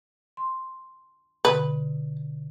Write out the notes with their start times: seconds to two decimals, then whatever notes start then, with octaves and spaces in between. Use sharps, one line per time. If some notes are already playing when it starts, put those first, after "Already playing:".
0.37 C6
1.45 B2 D3 B4